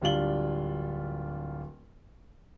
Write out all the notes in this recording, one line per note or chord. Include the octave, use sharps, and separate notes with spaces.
D1 G3 D4 F4 F#7 G7